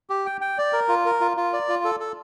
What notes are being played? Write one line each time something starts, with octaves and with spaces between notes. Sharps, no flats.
G4
G5
G5
D5
A#4
F4
A#4
F4
F4
D5
F4
A4
A4